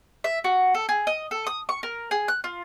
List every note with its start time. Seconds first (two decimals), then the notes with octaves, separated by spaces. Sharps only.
0.24 E5
0.44 F#4
0.75 A4
0.89 G#4
1.07 D#5
1.31 A4
1.47 D#6
1.69 C#6
1.83 A#4
2.11 G#4
2.28 F#6
2.44 F4